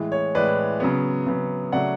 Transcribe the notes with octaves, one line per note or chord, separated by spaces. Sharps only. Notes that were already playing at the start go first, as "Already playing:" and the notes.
Already playing: A2 E3 G#3
C#5
A2 E3 G#3 B4 D5
C#3 F#3 B3
C#3 F#3 B3
C#3 F#3 A3 D5 F#5